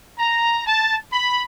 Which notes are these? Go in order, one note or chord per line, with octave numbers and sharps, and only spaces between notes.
A#5
A5
B5